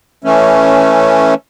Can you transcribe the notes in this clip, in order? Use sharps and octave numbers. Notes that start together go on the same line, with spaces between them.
E3 A3 C#4